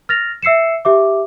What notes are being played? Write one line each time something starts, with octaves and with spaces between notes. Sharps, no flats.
F6 A6 A#6 F7
E5 E6 C7 C#7 E7
G4 E5 D6